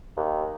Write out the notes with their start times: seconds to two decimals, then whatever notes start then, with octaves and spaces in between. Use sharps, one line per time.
0.17 D#2